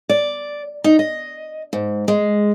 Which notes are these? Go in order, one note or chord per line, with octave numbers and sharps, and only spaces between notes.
D5
D#4
D#5
G#2
G#3